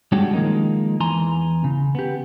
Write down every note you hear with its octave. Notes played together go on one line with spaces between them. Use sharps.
G3 G#3 C#4 D4 F#4 G4
D#3 F3 G#3 A#3 D#4
E2 E3 G#5 A#5 C6
C#3
B3 G4